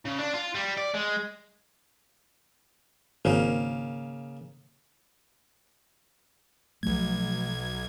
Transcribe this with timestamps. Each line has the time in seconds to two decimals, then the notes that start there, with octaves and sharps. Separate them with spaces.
0.05 C#3
0.19 D4
0.34 F4
0.55 G3
0.77 D5
0.94 G#3
3.25 G#1 C#3 A#3
6.83 B1 F3 F#3 A3 G#6